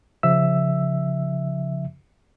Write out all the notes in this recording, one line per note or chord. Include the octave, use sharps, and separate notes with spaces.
C#3 F3 E5 E6